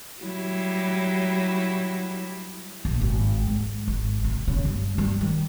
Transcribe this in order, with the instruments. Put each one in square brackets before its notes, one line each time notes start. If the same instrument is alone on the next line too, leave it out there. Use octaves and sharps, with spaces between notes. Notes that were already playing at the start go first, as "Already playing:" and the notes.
[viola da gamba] F#3 G3 E4
[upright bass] A#1
G#1
G#2
G#1
C3
C#3
G2
G3
D#3